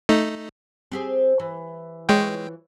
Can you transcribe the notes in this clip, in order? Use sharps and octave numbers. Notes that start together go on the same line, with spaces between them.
A3 D#4
C4 G4 G#4
E3
E3 G#3 F4 C#5 G5